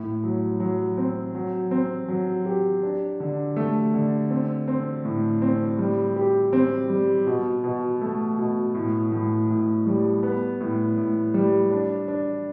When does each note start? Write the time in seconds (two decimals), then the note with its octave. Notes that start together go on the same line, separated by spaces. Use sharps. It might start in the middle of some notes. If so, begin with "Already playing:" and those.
Already playing: A2
0.24 F#3
0.60 F#3
0.97 C4
1.35 F#3
1.71 C4
2.08 F#3
2.46 G4
2.83 D4
3.20 D3
3.56 A3
3.94 D3
4.30 C4
4.68 C4
5.05 A2
5.42 C4
5.79 G3
6.16 G4
6.53 C4
6.90 G3
7.27 B2
7.64 B2
8.01 A3
8.38 B2
8.75 A2
9.12 A2
9.50 A2
9.86 G3
10.23 B3
10.61 A2
10.98 A2
11.34 G3
11.71 D4
12.08 D4